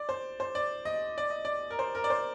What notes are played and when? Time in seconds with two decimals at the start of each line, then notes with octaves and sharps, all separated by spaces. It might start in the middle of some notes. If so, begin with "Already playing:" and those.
Already playing: D5
0.09 C5
0.40 C5
0.55 D5
0.85 D#5
1.18 D5
1.30 D#5
1.45 D5
1.70 A#4
1.79 C5
1.95 A#4
2.04 D5
2.10 C5